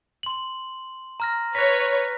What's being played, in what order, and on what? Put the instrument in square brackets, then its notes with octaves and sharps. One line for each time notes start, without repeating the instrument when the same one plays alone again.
[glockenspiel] C6 F#7
A#5 F6 A#6
[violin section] B4 C#5 [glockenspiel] F#6 A#6 B6